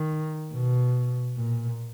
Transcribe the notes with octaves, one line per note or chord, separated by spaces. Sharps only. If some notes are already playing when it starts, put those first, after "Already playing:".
Already playing: D#3
B2
A#2